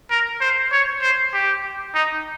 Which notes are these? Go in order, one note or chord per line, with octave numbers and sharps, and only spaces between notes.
A#4
C5
C#5
C5
G4
D#4